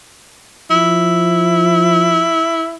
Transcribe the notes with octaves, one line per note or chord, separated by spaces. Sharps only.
F3 E4